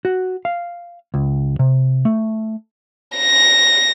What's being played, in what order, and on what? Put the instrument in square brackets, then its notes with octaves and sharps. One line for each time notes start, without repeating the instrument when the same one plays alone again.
[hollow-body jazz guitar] F#4
F5
C#2
C3
A3
[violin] A#6